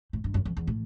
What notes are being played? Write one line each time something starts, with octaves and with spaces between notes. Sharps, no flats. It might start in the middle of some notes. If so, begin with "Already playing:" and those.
A2
G2
F#2
F2
E2
A2